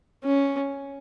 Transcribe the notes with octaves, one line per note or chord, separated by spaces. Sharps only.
C#4